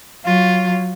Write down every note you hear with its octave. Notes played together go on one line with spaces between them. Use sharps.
F#3 F4